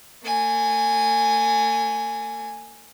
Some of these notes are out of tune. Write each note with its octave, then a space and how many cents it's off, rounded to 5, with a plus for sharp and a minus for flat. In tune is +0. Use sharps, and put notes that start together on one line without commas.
A3 +45 G#5 +0